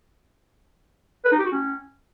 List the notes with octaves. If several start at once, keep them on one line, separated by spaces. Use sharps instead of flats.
B4
D#4
G4
F#4
C#4